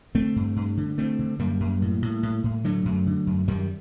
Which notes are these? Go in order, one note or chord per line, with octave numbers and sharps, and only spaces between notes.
D3 A3 C4
G2
G2
D3
D3 A3 C4
D3
F#2 G3 A#3
F#2
A2
A2
A2
A2
D3 F#3 A3
F#2
D3
F#2
F#2 D#3 G3